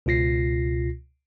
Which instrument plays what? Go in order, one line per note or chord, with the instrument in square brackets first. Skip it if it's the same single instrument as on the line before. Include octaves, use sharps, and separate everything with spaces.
[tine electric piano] C#2 B2 F4 A#6 C7